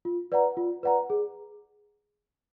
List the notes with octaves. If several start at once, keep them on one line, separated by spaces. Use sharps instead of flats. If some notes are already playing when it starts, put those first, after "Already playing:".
F4
B4 D5 F#5 A#5
F4
B4 D5 F#5 A#5
G#4